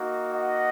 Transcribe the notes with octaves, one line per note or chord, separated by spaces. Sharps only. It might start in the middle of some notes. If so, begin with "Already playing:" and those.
Already playing: A#3 D#4 F#4
D#5 F#5